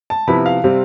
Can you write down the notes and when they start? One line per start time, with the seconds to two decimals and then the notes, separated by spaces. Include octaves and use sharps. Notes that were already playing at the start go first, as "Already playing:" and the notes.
0.10 A5
0.28 C3 F3 B3 E4 B5
0.46 F5
0.64 C3 G3 C4